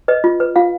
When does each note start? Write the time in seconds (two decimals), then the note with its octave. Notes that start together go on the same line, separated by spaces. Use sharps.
0.08 B4 D#5
0.24 F4
0.40 B4
0.56 F4 F5